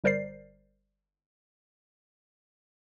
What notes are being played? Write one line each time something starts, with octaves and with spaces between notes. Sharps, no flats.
G1 G3 A#4 C5 D5 C7